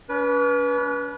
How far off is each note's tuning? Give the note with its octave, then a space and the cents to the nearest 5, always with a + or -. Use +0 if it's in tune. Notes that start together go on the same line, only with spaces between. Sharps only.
C#4 +45 B4 -20